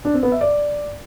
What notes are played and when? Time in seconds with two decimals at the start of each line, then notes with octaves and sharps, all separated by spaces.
0.05 D4
0.14 C4
0.23 B3
0.32 E5
0.41 D5